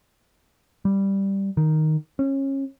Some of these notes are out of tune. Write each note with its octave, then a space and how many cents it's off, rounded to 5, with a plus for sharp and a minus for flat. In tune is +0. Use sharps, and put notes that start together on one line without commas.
G3 +0
D#3 +0
C#4 -25